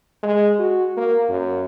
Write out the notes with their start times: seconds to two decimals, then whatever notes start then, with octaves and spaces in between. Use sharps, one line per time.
0.23 G#3
0.59 F#4
0.97 A#3
1.29 F#2